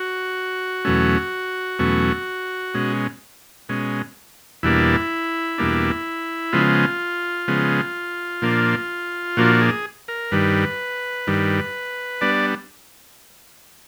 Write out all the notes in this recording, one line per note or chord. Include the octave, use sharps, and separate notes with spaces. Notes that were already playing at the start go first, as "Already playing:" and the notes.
Already playing: F#4
E2 B2 F#3 A3 C#4
E2 B2 F#3 A3 C#4
B2 G#3 C#4
B2 G#3 C#4
E2 B2 G3 A#3 D4 E4
E2 B2 G3 A#3 D4
C#3 F3 G#3 B3 F4
C#3 F3 G#3 B3
A#2 F3 A#3 D4
A#2 F3 A#3 D4 F#4
G#4
A#4
G2 D#3 G3 B4
G2 D#3 G3
G3 B3 D4 D5